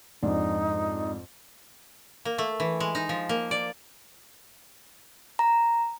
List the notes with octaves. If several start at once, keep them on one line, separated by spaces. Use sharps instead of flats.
F2 G#2 D4 D#4
A#3
A3
E3
G#3
D#4
F3
A#3
D5
A#5